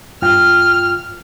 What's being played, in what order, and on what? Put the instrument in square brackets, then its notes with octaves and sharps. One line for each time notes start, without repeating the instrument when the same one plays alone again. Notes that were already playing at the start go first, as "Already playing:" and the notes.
[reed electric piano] G2 F4 G5 [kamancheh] F6